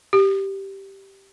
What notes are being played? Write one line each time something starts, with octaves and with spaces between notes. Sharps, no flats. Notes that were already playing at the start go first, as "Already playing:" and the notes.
G4